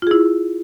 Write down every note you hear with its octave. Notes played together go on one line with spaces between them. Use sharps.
E4 F4 G#4